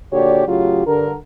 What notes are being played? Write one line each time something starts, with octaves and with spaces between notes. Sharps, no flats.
A#2 D3 F#4 G4 C#5 D5
A2 C#3 F#3 F4 G4
G2 D3 A#4